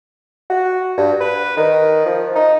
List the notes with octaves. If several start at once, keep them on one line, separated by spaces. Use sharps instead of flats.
F#4
G2
B4
D#3
F3
D#4